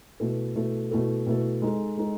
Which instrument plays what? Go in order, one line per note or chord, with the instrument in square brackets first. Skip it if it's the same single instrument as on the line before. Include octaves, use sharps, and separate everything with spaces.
[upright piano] B2 A3 E4 A4
B2 A3 E4 A4
B2 A3 E4 A4
B2 A3 E4 A4
G#3 D#4 A4
G#3 D#4 A4